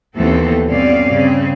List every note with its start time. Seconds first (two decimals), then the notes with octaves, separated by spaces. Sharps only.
0.16 D#2 E3 B3 C4 A4
0.69 G2 B2 C4 C#4 D5 F5
1.13 C#3 C4